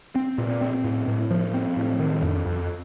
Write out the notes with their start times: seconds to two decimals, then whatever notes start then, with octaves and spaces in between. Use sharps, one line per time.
0.15 C4
0.38 A#2
0.61 C4
0.84 A2
1.08 A2
1.31 F3
1.54 C4
1.77 A2
2.00 D#3
2.22 F2
2.46 F2